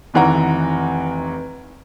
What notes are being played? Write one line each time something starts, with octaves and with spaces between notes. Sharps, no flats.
F1 D#3 E3 F#5 A#5